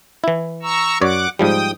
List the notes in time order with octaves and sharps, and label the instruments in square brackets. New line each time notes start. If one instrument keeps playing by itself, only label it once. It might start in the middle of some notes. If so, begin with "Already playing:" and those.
[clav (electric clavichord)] E3 E4
[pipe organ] A#5 C#6 E6
[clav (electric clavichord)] F#2 C#5 D5 [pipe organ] F#5 D6
[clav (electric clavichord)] G#2 F3 G3 [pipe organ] G5 D#6